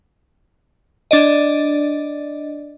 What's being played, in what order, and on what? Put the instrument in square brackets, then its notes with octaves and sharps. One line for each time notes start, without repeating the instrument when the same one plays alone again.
[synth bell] D4 D5 D#5